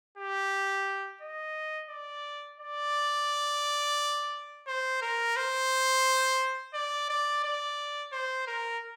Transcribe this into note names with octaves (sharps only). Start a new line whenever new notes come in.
G4
D#5
D5
D5
C5
A#4
C5
D5
D5
D5
C5
A#4